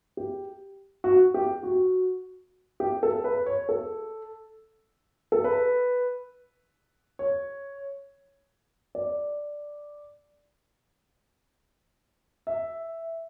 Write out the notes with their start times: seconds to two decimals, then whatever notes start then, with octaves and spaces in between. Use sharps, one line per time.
0.17 G4
1.04 F#4
1.34 G4
1.63 F#4
2.80 G4
3.03 A4
3.24 B4
3.46 C#5
3.69 A4
5.32 A4
5.44 B4
7.19 C#5
8.95 D5
12.47 E5